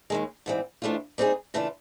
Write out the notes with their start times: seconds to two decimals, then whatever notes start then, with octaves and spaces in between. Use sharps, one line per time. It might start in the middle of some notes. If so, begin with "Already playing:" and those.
0.10 D#2 D#3 G#3
0.46 G#2 E3 G3 C4
0.82 G#2 E3 A3 D4 F4
1.18 G3 C4 D#4 G#4
1.54 C#3 E3 A3 D4 F4